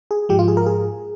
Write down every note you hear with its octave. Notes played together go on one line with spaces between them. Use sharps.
G#4
G#2 F3 G#3 G4
F4
G#4
A#4
G#4